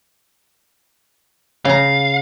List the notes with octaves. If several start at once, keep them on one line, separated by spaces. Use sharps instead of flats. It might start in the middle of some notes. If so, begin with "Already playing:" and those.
C#3 F5 A#5